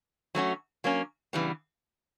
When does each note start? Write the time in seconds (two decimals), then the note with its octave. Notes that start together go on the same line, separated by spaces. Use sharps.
0.35 F#3 A3 C#4 F#4
0.84 F#3 A#3 C#4
1.33 C#3 E3 G3 B3